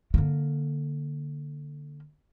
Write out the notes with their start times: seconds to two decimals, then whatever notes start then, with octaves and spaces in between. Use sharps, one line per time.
0.14 D3 A#3